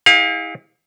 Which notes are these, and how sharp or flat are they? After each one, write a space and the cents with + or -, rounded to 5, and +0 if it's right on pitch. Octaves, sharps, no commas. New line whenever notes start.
E4 -35 G#4 -45 F5 +30